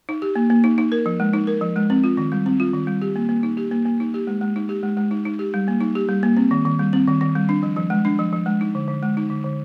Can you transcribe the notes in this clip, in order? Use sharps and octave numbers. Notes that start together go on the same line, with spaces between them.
D#4
G4
A#3
A#3
D#4
D#4
A#4
F3
G#3
D#4
A#4
F3
G#3
C4
F4
D#3
G3
C4
F4
D#3
G3
G4
A#3
A#3
D#4
G4
A#3
A#3
D#4
G4
G#3
G#3
D#4
G4
G#3
G#3
D#4
D#4
G4
G3
A#3
D#4
G4
G3
A#3
C4
D#3
D#3
G3
C4
D#3
D#3
G3
D4
F3
F3
G#3
D4
F3
F3
G#3
D#4
D3
D3
G#3
D#4
D3
D3